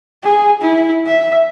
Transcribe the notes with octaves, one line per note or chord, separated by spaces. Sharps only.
G#4
E4
E5